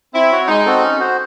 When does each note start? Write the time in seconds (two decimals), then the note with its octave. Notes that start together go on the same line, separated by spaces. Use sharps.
0.14 C4 E4
0.32 F#4 C#5
0.48 G#3 D#4
0.65 C4 F#4 A4
0.83 C#4
1.00 F#4 C5